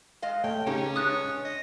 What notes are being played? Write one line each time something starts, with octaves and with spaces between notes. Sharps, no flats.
G#3 D#5 F5
A3 C#5 G5
C#3 C#4 D#4 G4
G#3 D4 D#6 F#6
D#5